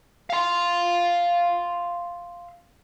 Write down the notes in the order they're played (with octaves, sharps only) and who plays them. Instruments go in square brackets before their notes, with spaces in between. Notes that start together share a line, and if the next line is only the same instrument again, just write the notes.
[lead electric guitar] F5 C6